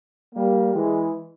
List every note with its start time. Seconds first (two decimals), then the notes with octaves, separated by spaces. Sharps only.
0.34 G3 A#3
0.72 E3 G#3